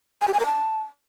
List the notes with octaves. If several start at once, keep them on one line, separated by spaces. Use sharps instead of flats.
G#5
G4
G#5
A#4
A5